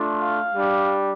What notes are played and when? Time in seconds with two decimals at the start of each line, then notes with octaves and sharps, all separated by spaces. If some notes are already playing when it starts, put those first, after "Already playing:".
Already playing: A3 D4 F4
0.18 F5
0.54 G3 D4 G4